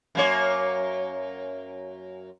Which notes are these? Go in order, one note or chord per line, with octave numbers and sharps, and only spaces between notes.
F#2 A#3 C#5